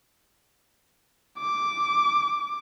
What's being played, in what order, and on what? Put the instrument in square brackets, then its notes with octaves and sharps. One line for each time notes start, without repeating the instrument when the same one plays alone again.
[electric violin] D6